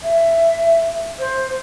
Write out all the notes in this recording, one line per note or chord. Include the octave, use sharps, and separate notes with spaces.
E5
C5